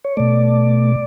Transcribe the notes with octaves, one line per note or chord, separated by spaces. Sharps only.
C#5
B2 A3 D5